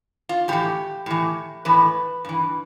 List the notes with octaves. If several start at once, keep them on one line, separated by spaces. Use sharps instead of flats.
F4
A2 E3 G4
A2 E3
A2 E3 B4
G2 E3